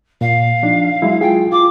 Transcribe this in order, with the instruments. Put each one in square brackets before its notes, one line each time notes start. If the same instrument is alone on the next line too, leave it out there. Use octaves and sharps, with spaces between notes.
[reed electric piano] A#2 [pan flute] F5
[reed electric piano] F3 D4 D#4
F#3 G#3 E4
[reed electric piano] F4 G#4 [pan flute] G5
[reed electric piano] F4 [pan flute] D6